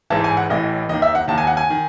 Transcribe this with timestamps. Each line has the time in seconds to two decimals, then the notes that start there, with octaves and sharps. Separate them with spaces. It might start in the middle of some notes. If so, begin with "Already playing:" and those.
0.10 A1 G#2 E3 A5
0.24 G#5
0.37 F#5
0.50 A1 A2 E3 D#5
0.89 D#2 D#3 D#5
1.02 E5
1.15 F#5
1.28 D#2 D#3 A5
1.38 G#5
1.47 F#5
1.57 G#5
1.70 D#3